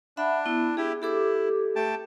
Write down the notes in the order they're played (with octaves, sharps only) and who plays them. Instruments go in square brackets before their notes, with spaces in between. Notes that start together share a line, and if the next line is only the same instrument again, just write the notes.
[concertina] D4 [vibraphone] E5 F#5 B5
[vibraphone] B3 E4
[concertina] E4 G4 [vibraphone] G#4
[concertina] E4 [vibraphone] G4 A4 D6
[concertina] A3 G5 A5